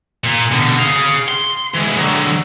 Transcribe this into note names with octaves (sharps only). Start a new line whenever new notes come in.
A#2
B2 D3
G#4 F5
C6
E3 G#3
D3 F#3